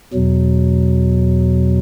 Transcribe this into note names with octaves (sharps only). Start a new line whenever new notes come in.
E2 B2 F#3